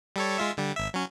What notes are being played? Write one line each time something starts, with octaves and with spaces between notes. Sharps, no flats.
G3 A4 C#5
G#3 F4 E5
D3 G3
G#1 E5
F#3 C#4